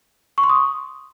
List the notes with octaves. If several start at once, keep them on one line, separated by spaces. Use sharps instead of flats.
C#6
C6
D#6